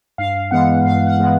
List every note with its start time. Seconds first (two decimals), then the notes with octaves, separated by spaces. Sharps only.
0.18 G2 F5
0.51 E3 G#3 B3 F#5
0.85 G2 F5
1.06 F#5
1.18 E3 G#3 B3